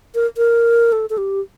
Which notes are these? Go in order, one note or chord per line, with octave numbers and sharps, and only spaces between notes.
A#4
A#4
A4
A4
G4